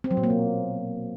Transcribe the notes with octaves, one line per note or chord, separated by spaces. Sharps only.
C4
F#3
A#2
A#3
B2